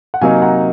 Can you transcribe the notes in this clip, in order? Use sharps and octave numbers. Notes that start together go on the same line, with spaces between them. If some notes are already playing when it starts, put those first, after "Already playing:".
F#5
C3 F#3 A#3 D#4 F5 G#5
F#5 A#5